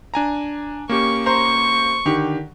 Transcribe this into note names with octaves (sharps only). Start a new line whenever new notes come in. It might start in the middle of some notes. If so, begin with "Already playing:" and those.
D4 G#5 A#5
A#3 C#4 G4 C#6
C5 A#5 C6 C#6
D3 D#3 G4